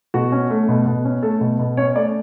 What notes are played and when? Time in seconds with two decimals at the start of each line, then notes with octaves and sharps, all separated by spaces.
0.14 B2 F#4
0.32 C#4
0.50 A3
0.69 B2
0.86 B2
1.05 C#4
1.23 A3 A4
1.41 B2
1.59 B2
1.77 C#4 C#5
1.95 A3 D5